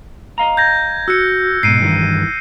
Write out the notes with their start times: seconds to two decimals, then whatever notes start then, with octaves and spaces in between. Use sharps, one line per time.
0.38 D#5 F5 A#5
0.57 G6 G#6 A#6
1.08 F#4 E6 F#6 C#7
1.63 G#2 B2 C7 D7 D#7
1.80 G2 D#3 E3